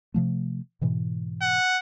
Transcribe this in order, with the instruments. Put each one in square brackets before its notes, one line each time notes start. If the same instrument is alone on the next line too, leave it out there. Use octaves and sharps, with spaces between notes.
[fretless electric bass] C3 F3 A3
G#2 B2 E3
[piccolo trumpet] F#5